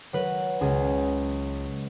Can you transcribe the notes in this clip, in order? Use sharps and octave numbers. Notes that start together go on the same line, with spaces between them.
F#3 B4
C#2 G#4